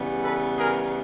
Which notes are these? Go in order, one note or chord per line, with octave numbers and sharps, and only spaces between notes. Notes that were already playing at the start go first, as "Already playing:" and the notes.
Already playing: C#3 E3 G3 B3
A4 B4
G#4 A#4